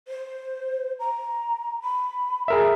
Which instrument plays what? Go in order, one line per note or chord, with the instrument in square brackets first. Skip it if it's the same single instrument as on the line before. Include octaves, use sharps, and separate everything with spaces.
[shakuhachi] C5
A#5
B5
[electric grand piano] G#4 A#4 E5